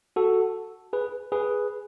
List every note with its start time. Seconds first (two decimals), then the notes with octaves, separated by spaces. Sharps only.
0.16 F#4 A4
0.93 G#4 B4
1.32 G#4 B4